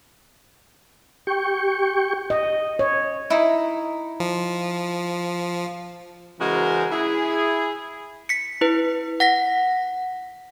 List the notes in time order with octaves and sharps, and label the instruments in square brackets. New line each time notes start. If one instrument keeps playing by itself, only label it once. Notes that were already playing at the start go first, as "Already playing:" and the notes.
[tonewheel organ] G4 G5 C#6
[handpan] D#5
C#5
[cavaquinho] D#4 E4
[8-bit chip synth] F3
[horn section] C#3 E3 G#3 F#4 A#4 C5
E4 G#4
[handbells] B6 C#7
E4 B4
F#5 A#6 B6